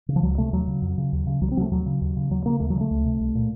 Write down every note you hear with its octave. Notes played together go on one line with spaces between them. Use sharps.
C#3
F3
C#2 F#3
C3 A3
D#2 F#3
C#3
F2
C#3
D#2
C#3
C2 F#3
C4
C3 F#3 A3
D#2 F#3
C#3
D#2
C#3
D#2 F#3
C#3 A#3
D#2 A3
C#3 F#3
A3
C#2
C3
C2
A#2